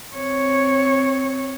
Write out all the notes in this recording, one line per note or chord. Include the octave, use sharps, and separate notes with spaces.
C4 C#5